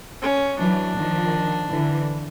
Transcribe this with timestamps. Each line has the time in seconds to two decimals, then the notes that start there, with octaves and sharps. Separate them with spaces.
0.22 C#4
0.59 E3 F#3 D4
0.96 D#3 F3
1.70 D3 E3